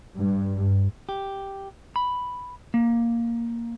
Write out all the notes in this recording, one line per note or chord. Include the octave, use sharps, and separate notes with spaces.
G2
G4
B5
A#3